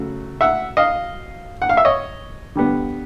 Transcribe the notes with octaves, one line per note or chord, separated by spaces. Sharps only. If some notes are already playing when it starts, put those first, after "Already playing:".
Already playing: C#3 F#3 A3
E5 F#5
D#5 F5
F#5
F5
E5
C#5 D#5
D3 G3 B3